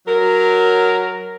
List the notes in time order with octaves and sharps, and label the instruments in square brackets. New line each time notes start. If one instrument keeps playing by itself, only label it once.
[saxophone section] F#3 A#4